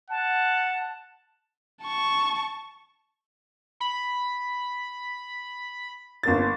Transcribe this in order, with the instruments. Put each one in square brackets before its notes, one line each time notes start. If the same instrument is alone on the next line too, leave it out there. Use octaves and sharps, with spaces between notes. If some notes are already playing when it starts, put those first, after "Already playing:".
[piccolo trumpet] F#5 [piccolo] A5
[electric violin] A5 C#6
[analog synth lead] B5
[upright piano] G1 A#3 A6